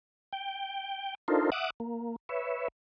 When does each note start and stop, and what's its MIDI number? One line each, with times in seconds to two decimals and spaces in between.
0.33 1.15 79
1.28 1.50 62
1.28 1.50 63
1.28 1.50 65
1.28 1.50 69
1.28 1.50 70
1.28 1.50 72
1.52 1.70 76
1.52 1.70 78
1.52 1.70 86
1.52 1.70 87
1.52 1.70 90
1.80 2.16 58
2.29 2.68 71
2.29 2.68 73
2.29 2.68 76